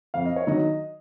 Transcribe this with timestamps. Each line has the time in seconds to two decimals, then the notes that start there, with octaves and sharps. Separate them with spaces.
0.14 F2 F5
0.25 D#5
0.36 C#5
0.47 D#3 F#3 D#5